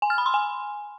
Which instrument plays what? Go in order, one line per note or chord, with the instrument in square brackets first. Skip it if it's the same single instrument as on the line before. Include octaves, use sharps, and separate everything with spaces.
[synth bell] G#5
F6
B5
C6
G#5